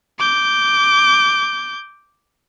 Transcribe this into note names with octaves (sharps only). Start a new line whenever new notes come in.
D6 G6